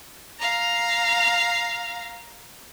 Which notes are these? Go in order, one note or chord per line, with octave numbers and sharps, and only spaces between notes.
F5 A#5